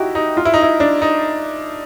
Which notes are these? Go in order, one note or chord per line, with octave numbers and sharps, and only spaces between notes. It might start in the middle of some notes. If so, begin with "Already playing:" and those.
Already playing: D#4 E4 F#4 G4
D#4
F4
E4
D#4
E4
D4
D#4